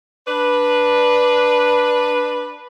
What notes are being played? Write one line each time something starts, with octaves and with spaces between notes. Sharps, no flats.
D4 B4